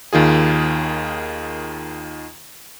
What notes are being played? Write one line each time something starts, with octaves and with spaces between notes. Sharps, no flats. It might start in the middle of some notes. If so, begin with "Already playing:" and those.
D#2 D#3 F4 G#4